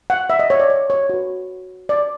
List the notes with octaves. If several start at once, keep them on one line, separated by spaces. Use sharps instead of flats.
F#5
E5
D#5
C#5
D5
C#5
C#5
F#4 B4
D5